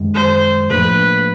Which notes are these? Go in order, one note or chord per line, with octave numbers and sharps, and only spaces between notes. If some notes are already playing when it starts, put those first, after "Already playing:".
Already playing: F#2 D#3 G#3
C5
A2 F3 A#3 D4 B4